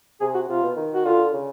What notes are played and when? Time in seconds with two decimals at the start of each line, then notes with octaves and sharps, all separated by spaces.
0.21 C3 G#4
0.34 F#4
0.49 C3 F4
0.63 B2
0.77 D#3
0.94 F#4
1.05 D3 F4
1.33 C#3